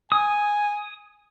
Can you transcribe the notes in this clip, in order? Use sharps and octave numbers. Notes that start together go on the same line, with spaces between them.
G#5 D#6